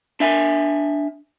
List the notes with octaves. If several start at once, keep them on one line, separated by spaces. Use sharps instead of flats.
D4 E5 G#5